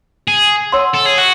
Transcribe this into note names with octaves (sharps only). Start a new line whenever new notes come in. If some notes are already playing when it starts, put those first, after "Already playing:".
G#4
C#5 F#5 C6 E6
A4
G#4
F#4